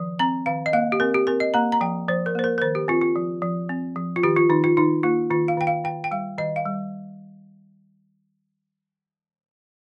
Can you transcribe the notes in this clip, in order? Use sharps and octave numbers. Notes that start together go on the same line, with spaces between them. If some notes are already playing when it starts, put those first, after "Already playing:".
Already playing: D#3 F3
C4 A#5
D#3 F5
D#5
A#3 F5
G4
C4 A#4
G4
C4 A#4
D#5
A#3 A#5
A#5
F3 G5
F3 C5
A#4
A#3 C5
A#4
A#4
D#3 C5
G4
C4 F4
F4
F3
F3
C4
F3
F4
D#3 G4
F4
D#3 D#4
F4
D#3 D#4
A#3 F4
D#3 F4
F5
D#3 G5
F5
D#3 G5
G5
G3 F5
D#3 D#5
F5
G3